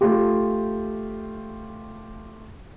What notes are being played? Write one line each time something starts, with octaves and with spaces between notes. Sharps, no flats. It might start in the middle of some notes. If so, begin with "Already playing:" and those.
A3 F4 G4